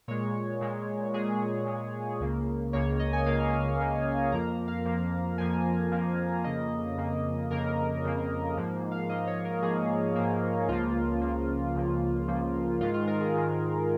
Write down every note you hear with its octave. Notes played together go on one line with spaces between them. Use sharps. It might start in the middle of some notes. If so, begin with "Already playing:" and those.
A#2 G#3 C#5
A#2 G#3
A#2 G#3 G#4
A#2 G#3
C#2 C#3 A#3
C#2 C#3 A#3 C#5
D#5
G#5
C#2 C#3 A#3 F5
C#2 C#3 A#3
F2 F3 A#3 A#5
F5
F2 F3 A#3
F2 F3 A#3 G#5
F2 F3 A#3
F2 C#3 A#3 D#5
F2 C#3 A#3
F2 C#3 A#3 A#4
F2 C#3 A#3
G#2 F3 A#3
F5
G#2 F3 A#3 D#5
C#5
A#4
G#2 F3 A#3 G#4
G#2 F3 A#3
C#2 C#3 F3 A#3 F4
C#2 C#3 F3 A#3
C#2 C#3 F3 A#3
C#2 C#3 F3 A#3
G#2 D#3 G#3 F4
F4
A#4
G#4
G#2 D#3 G#3